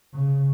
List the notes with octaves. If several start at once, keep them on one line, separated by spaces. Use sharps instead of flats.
C#3